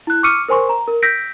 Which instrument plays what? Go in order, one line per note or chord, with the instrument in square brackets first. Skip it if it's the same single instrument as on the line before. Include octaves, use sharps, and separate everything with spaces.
[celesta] E4 F#6
C#6 D6 E6 F6 C#7 D#7
A#4 C5 G#5 C6 C#6
A#5
A#4
E6 G6 A#6 B6 D7